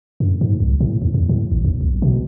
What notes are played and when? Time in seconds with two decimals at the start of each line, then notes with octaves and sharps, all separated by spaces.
0.20 F#2
0.41 G#2
0.60 C2
0.80 A2
1.02 D#2
1.14 E2
1.29 A2
1.51 A1
1.65 D#2
1.81 B1
2.02 B2